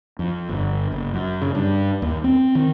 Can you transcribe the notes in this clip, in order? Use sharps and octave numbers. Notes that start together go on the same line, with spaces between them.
F2
G1
F#1
F#2
C#3
G2
D#2
C4
D#3